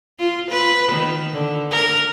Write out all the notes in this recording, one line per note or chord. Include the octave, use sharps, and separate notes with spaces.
F4
B4
D#3
D3
A#4